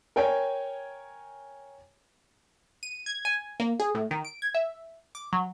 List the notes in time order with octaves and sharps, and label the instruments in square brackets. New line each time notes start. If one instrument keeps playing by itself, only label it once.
[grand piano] A#4 C#5 G5 G#5
[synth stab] D#7
G#6
G#5
A#3
G#4
A2
D#3
D7
G#6
E5
D6
F#3